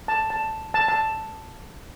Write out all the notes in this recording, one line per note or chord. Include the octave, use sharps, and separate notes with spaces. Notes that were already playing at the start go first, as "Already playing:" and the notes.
A5
A5
A5
A5